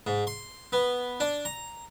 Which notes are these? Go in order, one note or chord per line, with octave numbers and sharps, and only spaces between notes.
G#2
C6
B3
D4
A#5